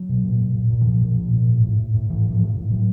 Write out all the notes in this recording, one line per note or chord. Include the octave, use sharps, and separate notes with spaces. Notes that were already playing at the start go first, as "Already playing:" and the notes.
Already playing: F#3
B2
A#2
A#2
A#2
A#2
E3
A#2 F3
A#2
A#2
A#2
A2
A2
A2
A2
A2 E3
A2 F3
A2
A2
A2 F#3